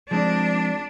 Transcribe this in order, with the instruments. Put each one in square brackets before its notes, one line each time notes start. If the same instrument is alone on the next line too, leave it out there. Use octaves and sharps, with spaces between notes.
[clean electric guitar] F3 G#3 C4 [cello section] D4